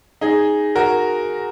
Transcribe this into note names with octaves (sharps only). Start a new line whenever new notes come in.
D#4 G#4
F#4 A#4